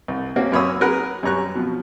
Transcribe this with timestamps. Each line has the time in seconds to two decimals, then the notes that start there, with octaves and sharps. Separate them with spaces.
0.08 C2
0.36 A#3 C4 C#4 F#4
0.52 F#2 A#3 C#5 B5 D#6 E6
0.80 F#3 G#4 A#4 B4 F#5
1.23 F#2 G3 C#4 A#5 C#6 F#6
1.55 B2 F3